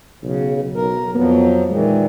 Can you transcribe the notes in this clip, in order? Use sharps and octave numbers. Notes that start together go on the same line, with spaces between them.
B1 C#3
B1 A#4
F2 F3 F#3 B3
A#2 D#3 E3 G#3